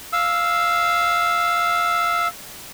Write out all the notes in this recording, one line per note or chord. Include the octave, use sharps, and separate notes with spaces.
F5 E6